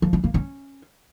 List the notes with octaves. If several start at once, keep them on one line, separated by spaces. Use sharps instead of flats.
F3
C4
A#3
C#4